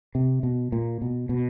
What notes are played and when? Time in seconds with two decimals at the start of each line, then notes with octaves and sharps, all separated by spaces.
0.15 C3
0.43 B2
0.72 A#2
1.02 B2
1.29 B2